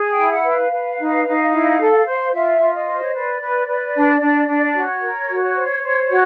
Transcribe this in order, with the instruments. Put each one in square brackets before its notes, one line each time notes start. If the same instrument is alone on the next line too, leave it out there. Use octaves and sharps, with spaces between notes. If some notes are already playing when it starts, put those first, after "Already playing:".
Already playing: [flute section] G#4
G5
E4
F#5
B4
F5
B4
D#4
D#4
E4
A4
C5
F4 E5
F4
D#5
C5
C#5
B4 D5
B4
B4
D4
D4
D4
F#4 C#5
A#4
F#4
C5
C5
F#4